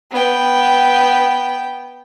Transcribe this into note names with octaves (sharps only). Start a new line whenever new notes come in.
B3 G5